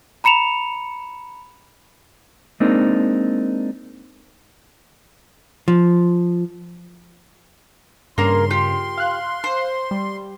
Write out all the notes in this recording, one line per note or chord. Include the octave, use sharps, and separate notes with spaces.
A#5 B5 C#7 E7 F7
G#3 A#3 C4 D4 D#4
F3
G2 C#3 A#3 A#4 C6
F4 G4
F5 F#6
C5
G3